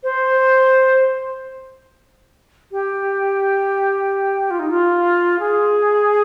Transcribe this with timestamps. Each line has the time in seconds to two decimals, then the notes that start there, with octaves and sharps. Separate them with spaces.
0.03 C5
2.71 G4
4.50 F4
4.59 D#4
4.70 F4
5.39 G#4